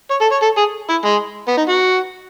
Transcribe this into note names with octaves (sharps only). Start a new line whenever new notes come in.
C#5
A4
C#5
A4
G#4
E4
G#3
B3
D#4
F#4